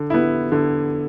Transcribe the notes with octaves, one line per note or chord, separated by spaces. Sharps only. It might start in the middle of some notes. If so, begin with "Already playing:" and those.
Already playing: D3
B3 E4
D3